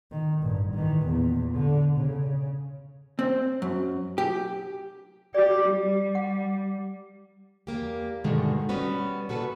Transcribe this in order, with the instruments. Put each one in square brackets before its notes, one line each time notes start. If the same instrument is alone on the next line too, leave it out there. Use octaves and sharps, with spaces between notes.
[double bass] D#3
A1 G2
D#3 E3
E2 A#2
D3
C#3
[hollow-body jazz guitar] C4
F#2
G4
[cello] G4 [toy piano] D5
[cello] G3
[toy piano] F#5
[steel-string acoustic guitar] E2 A#3 G4
G2 B2 D3 D#3 G#3 A3
G3 B3 C#4 F#4 B4
A#2 F#4 A4 B4